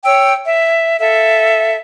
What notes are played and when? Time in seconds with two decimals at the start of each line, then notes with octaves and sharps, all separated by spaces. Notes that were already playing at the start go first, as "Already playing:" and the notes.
0.04 C#5 G5 E6
0.45 E5
1.00 A4 E5 F5